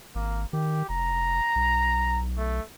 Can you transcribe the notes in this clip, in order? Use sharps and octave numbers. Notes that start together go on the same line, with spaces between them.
G#1 A#3
D#3 G4
F1 A#5
B1
A3